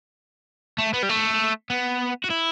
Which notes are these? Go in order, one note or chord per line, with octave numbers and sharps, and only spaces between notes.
A3
B3
G3
A3
B3
F#4
E4